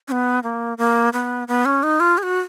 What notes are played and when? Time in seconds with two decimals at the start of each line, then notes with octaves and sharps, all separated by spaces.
0.08 C#4
0.12 B3
0.43 A#3
0.78 A#3
1.13 B3
1.48 B3
1.65 C#4
1.83 D#4
2.00 F4
2.18 G#4
2.23 F#4